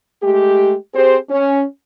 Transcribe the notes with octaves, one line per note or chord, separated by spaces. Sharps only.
G#3 A3 G4
C4 G4 G#4 C5
C#4